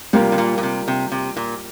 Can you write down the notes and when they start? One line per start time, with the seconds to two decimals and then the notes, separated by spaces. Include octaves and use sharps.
0.13 C3 G3 A#3 F4 A#4
0.32 C3
0.38 A#2
0.58 A#2
0.63 C3
0.88 C3
1.12 C3
1.37 A#2